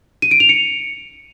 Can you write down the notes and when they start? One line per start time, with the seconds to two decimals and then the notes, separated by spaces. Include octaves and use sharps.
0.22 D#7
0.31 D7
0.40 F7
0.49 C#7